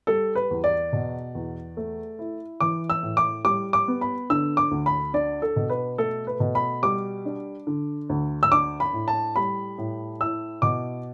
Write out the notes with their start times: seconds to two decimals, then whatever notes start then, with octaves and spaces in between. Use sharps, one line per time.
0.07 G3 A4
0.35 B4
0.50 E2
0.64 D5
0.93 B2
1.35 E2
1.77 A3
2.19 E4
2.60 E3 D6
2.90 E6
3.03 A2
3.17 D6
3.45 G3 D6
3.73 D6
3.88 B3
4.01 B5
4.30 D3 E6
4.57 D6
4.71 D2
4.86 B5
5.14 D4 D5
5.42 A4
5.56 B2
5.70 B4
5.98 A3 A4
6.27 B4
6.40 B2
6.55 B5
6.83 G3 D6
7.25 D4
7.67 D3
8.09 D2
8.43 E6
8.52 D4 D6
8.80 B5
8.93 A2
9.08 A5
9.36 G3 B5
9.78 A2
10.21 E4 E6
10.62 B2 D6